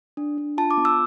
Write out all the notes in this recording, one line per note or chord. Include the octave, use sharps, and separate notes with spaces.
D4
D4
F4 A5
D6
B3
E6